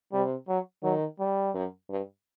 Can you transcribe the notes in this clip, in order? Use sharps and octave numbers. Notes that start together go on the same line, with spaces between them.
C3 G3
F#3
D#3 F#3
G3
F#2
G2